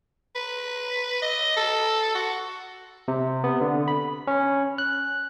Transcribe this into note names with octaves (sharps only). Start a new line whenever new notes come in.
B4
D#5
A4
F#4
C3
B3
D3
B5
C#4
F#6